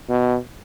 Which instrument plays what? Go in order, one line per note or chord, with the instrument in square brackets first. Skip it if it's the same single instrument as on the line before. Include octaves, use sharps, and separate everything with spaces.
[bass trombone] B2